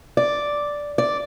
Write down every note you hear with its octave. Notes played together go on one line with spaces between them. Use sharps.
D5
D5